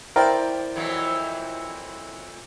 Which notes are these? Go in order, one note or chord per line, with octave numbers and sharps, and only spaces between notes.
E4 A#4 C5 D5 G5
F2 E3 F#3